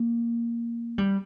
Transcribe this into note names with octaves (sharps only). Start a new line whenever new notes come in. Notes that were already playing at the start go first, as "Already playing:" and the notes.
Already playing: A#3
G3